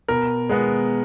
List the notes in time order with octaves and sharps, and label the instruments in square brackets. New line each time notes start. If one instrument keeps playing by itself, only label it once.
[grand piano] B2 A#4
G#3 B3